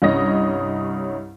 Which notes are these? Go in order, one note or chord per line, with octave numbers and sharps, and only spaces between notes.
C2 G2 C#4 C#5 D#5 A#6